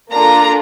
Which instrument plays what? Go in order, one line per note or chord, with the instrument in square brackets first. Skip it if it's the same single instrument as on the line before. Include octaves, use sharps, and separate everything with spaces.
[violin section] A#3 D4 F4 A4 A#5